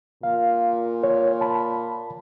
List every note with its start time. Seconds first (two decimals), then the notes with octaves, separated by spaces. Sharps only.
0.23 A#2 F5
1.03 C#5
1.41 A5 B5